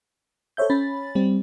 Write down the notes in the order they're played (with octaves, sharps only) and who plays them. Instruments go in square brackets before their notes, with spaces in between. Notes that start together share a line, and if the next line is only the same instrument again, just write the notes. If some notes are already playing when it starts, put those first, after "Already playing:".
[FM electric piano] A4 C5 C#5 E5 G6
C#4 B5 A6
G3 C4 G4